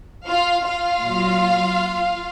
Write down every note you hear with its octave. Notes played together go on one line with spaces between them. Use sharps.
F4 F5
F4 F5
A#2 F#3